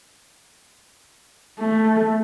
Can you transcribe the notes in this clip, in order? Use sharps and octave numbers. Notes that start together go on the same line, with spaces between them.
A3